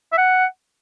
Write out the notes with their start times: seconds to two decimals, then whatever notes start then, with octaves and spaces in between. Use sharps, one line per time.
0.12 E5
0.18 F#5